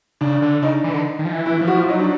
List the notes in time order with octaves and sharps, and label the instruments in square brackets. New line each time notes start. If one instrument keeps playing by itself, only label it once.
[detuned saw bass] C#3 [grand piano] D4
[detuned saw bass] D3
[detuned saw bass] C#3 [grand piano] D#4
[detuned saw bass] E3
D3
D#3
F3
E3
[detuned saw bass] E3 [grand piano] E4
[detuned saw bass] F3 [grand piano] E4
[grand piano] F#4
[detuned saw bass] F3 [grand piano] F4
[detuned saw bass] F#3 [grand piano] D#4
[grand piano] D4